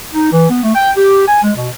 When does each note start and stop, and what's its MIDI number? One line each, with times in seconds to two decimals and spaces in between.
0.14 0.30 63
0.32 0.46 52
0.50 0.63 59
0.63 0.72 57
0.75 0.90 79
0.97 1.24 67
1.27 1.41 80
1.43 1.51 56
1.56 1.68 47